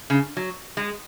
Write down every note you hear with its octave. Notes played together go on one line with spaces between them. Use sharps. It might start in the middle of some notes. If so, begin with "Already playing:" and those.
C#3
F#3
G#3